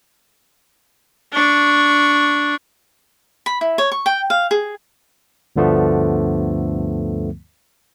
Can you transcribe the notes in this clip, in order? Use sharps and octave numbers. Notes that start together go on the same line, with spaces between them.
D4 C#6
B5
E4
C#5
C#6
G5
F5
G#4
D2 G2 D3 F3 A3 B3